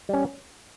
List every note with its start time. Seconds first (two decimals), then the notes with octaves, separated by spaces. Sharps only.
0.09 G3 C#4